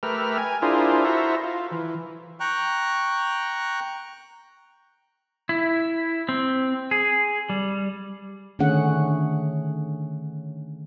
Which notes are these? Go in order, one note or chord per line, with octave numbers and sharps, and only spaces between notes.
A3 G4 A#4 B4 E5 F6
G#5
D4 E4 F4 G#4 A#4 C5
E4 F#4 A4 C5 E5 A#5
F4
E3
G5 A#5 C#6 F#6
E4
C4
G#4
G3
D3 D#3 A3 C#4 G#4 F#5